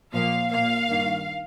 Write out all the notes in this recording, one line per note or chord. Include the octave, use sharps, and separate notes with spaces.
A#2 F3 A#3 F5
A#2 A#3 F5
G2 D#3 A#3